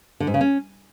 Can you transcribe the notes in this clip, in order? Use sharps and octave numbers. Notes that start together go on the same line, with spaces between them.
D3
G#2
C#3
C#4